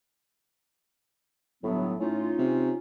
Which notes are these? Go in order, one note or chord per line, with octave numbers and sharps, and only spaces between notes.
G1 A2 F#3 B3
A2 C#4 D#4 F4
C3